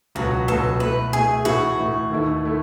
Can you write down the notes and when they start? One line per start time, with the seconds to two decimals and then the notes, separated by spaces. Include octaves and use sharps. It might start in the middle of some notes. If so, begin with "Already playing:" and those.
0.15 C#2 B2 F#3 F#4
0.48 C#2 B2 F#3 A4
0.80 B2 A3 E4 B4
1.12 B2 A3 E4 G#4
1.45 A2 E3 A3 E4 F#4
1.78 A2 E3 A3 E4
2.10 D#2 D#3 A3 E4
2.44 D#3 A3 E4